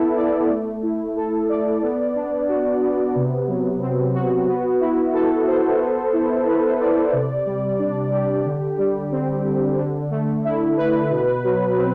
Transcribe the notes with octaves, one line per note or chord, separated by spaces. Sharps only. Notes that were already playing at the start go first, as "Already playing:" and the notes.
Already playing: B3 E4 A4
D5
A3
E4
A4
D5
B3
D4
F#4
B3
C3
F#3
C4
F#4
B3
E4
A4
C5
B3
E4
B4
D5
C3
G3
D4
G4
D3
G3
C4
D3
D3
A3
E4
B4
B2
F#3
C4